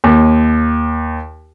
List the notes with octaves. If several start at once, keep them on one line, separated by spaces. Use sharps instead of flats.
D#2